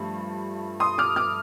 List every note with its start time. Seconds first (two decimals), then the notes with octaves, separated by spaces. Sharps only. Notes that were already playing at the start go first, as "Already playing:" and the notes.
Already playing: G2 F3 A3
0.80 C6 D#6
0.98 D6 F6
1.16 D6 F6